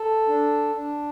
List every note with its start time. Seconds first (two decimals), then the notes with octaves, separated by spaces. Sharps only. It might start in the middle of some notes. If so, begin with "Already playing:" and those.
Already playing: A4
0.28 D4
0.74 D4